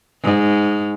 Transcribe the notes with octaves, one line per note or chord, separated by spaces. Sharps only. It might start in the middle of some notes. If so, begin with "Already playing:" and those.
G#2